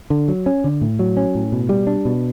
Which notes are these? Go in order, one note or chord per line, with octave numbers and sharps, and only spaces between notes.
D3
F#3
C#4
D3
A2
F#3
C#4
A2
B2
G3
D4
B2